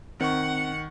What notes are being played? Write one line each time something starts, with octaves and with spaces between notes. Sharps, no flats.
D#3 C4 F#5 C#6